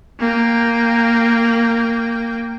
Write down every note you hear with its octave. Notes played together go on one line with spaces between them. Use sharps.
A#3 G5